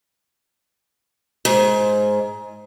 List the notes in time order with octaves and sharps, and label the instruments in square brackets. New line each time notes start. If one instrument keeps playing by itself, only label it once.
[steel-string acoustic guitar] G#2